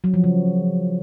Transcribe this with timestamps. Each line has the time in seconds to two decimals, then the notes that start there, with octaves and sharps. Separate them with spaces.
0.04 F#3
0.14 F3
0.24 C#3